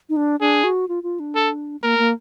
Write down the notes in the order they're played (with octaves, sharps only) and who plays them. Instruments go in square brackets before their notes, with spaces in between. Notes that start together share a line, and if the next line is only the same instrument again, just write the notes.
[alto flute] D#4
D4
[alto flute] D4 [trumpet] G#4
[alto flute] F#4
F4
F4
D4
[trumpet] A4
[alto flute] A#3 [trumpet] A#4
[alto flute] A#3